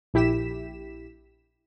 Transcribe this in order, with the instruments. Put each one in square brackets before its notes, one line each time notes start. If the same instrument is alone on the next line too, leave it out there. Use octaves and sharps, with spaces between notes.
[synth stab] A#1 E4 G4 B6 E7